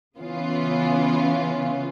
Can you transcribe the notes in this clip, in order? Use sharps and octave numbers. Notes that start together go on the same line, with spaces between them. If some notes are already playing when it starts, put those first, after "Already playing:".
C#3 E3 B3 C#4 F4